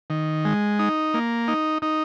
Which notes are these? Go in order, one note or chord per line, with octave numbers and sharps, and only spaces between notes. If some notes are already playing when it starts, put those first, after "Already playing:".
D#3
G#3
D#4
A#3
D#4
D#4